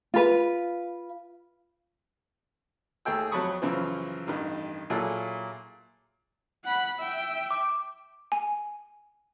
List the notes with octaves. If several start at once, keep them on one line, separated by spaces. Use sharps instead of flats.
F4 B4
D#2 A3 G#4 G5 E6
F2 F#3 A5 B5 C#6 D#6
F#2 C#3 E3 F3
A1 G2 D#3
A#2 F#3 E4 G#4 A4
F#5 B5
E5 G5
D6
G#5